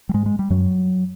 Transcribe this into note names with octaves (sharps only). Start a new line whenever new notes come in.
G3
G#2 G#3
G#3
G3
F#2 F#3